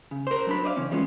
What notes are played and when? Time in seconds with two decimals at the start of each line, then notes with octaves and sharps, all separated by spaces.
0.11 C#3
0.27 A#4 C5
0.47 F#3 D4 B5
0.64 C5 D5 D#5 F5
0.76 C#3 E3 C4 C#4
0.91 E3 G3 G#3 B3 C#4 F4